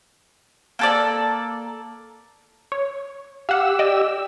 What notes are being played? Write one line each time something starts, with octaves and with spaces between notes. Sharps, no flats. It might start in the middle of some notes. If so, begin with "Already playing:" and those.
A#3 A4 D5
C#5
G4 F5 F#5 E6
D5 D#5